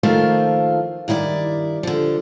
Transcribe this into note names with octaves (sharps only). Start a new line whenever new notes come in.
D#3 F3 A3 A#3 F4 C5
G2 D#3 E4 G4 D5
D3 F3